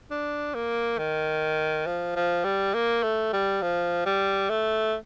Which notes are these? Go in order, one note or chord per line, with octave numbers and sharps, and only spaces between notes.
D4
A#3
D#3
F3
F3
G3
A#3
A3
G3
F3
G3
A3